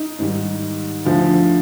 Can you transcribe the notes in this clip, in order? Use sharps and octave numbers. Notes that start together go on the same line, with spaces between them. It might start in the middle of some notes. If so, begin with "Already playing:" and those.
Already playing: D#4
G#2 D#3 G3
D2 D3 F3